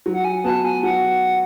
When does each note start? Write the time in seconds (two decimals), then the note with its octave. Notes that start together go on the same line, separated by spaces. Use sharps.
0.06 F#3
0.13 F#5
0.25 G#5
0.44 B3 F#4 A5
0.64 G#5
0.83 F#3 F#5